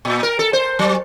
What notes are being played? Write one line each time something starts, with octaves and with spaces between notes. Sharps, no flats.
A#2
A#4
A4
C5
F#3